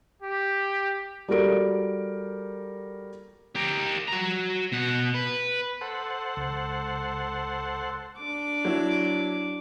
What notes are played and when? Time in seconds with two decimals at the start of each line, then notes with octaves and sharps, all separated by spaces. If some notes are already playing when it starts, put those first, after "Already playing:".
0.22 G4
1.28 G3 F#4 A4 A#4 D7
3.56 G4 A#4
4.08 F#4 A#5
4.72 B2 F#5
5.14 B4
5.81 A4 C5 F#5
6.37 C#2
8.18 D4 D6
8.65 F#3 E4